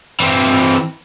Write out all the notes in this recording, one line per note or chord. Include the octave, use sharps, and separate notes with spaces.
E3 C4